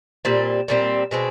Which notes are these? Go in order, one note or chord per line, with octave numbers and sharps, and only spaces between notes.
A#2 G3 C4
A#2 G3 C4
B2 G#3 C4